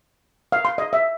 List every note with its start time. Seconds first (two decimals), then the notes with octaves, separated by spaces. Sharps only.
0.52 F5
0.65 C6
0.78 D#5
0.93 E5